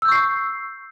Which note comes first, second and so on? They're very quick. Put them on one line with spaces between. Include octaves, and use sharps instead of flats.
E6 G6 C#6 C7